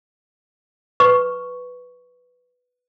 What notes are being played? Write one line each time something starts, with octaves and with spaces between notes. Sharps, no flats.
B4 C#6